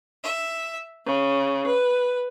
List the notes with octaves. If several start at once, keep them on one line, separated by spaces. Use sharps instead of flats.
E5
C#3
B4